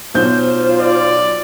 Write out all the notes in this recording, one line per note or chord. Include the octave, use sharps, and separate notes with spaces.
B1 F4 C5 G6
D5